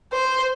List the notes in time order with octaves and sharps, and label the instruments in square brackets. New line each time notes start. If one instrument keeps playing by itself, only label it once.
[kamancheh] C5